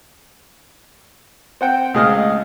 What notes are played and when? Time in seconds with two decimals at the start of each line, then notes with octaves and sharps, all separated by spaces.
1.61 C4 F#5 G5
1.94 C#2 A2 G#4 D#5 F5 F6